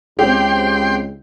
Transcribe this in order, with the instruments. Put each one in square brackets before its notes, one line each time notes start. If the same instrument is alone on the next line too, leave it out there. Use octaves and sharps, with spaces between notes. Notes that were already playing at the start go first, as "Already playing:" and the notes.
[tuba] C#2 [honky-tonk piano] C4 G4 [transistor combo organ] G5 C6